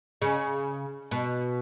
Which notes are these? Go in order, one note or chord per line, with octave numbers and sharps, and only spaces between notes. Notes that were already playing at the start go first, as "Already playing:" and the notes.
C#3
B2